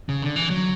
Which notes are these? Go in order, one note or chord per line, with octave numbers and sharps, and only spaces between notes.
C#3
D3
E3
F#3